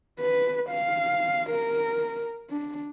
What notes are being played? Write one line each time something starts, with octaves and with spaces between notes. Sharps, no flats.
B4
F5
A#4
D4